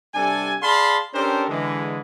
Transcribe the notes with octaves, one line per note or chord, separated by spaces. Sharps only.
C3 G3 D4 A4 G#5
G#4 D5 F5 A5 B5 C6
C#4 D4 G4 A4 A#4 C5
D3 E3 G#3